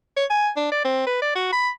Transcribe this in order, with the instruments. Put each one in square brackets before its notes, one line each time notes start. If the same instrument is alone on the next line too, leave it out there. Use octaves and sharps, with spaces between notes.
[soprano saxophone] C#5
G#5
D4
D5
C4
B4
D5
F#4
B5